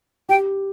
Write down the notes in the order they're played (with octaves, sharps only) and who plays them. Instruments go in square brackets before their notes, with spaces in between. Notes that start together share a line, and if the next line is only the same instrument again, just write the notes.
[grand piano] G4 [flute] G5